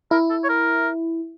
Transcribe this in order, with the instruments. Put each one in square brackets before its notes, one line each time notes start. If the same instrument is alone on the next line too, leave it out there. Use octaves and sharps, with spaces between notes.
[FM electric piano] E4 [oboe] A#4
[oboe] A4
C#5
A#4